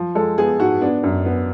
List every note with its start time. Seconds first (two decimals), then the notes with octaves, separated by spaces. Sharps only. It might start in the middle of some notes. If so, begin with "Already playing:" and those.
Already playing: F3
0.15 G#3 A4
0.38 B3 G#4
0.60 G#2 F#4
0.81 B3 D4
1.03 F#2
1.25 B3